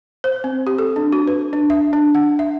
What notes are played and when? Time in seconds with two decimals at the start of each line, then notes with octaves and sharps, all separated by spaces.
0.24 C5
0.44 C4
0.67 G4
0.78 A4
0.96 D4
1.12 F#4
1.27 B4
1.53 D4
1.70 E5
1.93 D4
2.15 F#5
2.39 E5